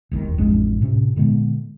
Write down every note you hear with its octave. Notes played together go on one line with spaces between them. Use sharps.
E1 D#2 D#3
A1 F2 G#3 D4
A2 C3 C#4
A#2 D3 G#3 B3